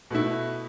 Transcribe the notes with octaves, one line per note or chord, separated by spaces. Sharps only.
B2 A3 E4